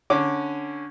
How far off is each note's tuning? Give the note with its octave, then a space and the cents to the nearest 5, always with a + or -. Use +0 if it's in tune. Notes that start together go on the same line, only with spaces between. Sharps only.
D3 +0 C#4 +0 D6 +0